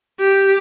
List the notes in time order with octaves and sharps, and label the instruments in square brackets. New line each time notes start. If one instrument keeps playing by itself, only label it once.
[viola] G4